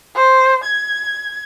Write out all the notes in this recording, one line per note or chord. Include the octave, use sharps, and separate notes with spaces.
C5
G#6